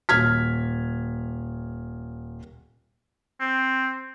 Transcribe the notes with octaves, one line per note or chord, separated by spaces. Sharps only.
D#1 F6 G#6 B6
C4